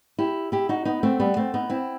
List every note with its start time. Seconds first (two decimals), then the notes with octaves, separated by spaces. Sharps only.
0.19 E4 G4
0.52 E4 G4
0.69 D#4 F#4
0.85 B3 D#4
1.03 A3 C4
1.19 G3 B3
1.37 A3 C4
1.54 B3 D#4
1.70 C4 E4